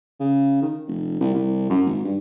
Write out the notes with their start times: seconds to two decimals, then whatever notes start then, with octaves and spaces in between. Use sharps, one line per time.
0.20 C#3
0.62 D#3
0.87 F1
1.20 C2
1.34 C2
1.70 F#2
1.86 G#1
2.04 G2